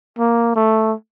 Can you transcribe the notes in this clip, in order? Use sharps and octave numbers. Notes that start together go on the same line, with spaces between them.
A#3
A3